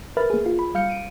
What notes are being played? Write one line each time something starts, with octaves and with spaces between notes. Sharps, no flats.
A#4 B4 E5 B5 F6 A6
A#3 G#4
F4
B5
G3 F5 F6 G6 C#7
D7 D#7